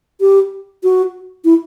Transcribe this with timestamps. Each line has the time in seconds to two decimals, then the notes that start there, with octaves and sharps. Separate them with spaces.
0.21 G4
0.83 F#4
1.45 E4